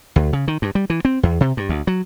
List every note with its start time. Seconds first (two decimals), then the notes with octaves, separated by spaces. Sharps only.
0.16 D2
0.33 C#3
0.48 D#3
0.62 G2
0.75 G3
0.90 E3
1.05 C4
1.23 E2
1.41 C3
1.57 G2
1.69 D2
1.87 F#3